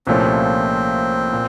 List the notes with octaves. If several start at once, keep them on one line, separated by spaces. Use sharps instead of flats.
C2 A#2 F3 A3 C4 C#4
A#2